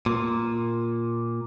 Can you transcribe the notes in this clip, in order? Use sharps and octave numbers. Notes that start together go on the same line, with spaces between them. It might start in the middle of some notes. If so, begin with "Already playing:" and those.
A#2